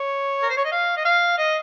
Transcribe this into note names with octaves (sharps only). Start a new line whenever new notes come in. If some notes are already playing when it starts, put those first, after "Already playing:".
Already playing: C#5
A#4
C5
C#5
D#5
F5
D#5
F5
D#5